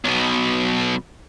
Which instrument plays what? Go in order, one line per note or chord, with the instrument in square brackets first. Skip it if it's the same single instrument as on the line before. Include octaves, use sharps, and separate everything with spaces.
[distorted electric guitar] B1 B2